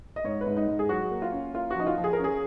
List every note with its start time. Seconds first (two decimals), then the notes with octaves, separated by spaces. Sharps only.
0.16 D#5
0.24 G#2 C#5
0.41 B4
0.46 G#2
0.57 D#4
0.68 G#2
0.79 G#4
0.89 F#3 F#4
1.11 A#3
1.22 F4
1.32 C#4
1.54 A#3 F4
1.71 F#4
1.76 F3 D#4
1.87 F4
1.98 F3
2.04 G#4
2.13 A#4
2.19 C#4 G#4